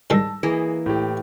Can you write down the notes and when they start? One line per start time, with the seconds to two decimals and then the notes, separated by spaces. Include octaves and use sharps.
0.10 G#2 D#3 G3 A5 E6 A#6
0.43 E3 A#3 G#4 D#5
0.86 A2 G4